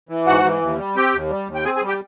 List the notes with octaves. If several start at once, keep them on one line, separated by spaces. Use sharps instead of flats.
E3
G#2 F#4 F#5
E3
D#2
G3
C4 G4 G5
D#2
G3
D#2
G5
C4 G#4 G#5
G#4 G#5
G3
G4 G5